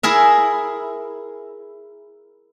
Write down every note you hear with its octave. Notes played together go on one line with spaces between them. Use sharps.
E4 G#4 A#4 E5